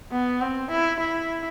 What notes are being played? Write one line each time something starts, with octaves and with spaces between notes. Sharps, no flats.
B3
C4
E4
E4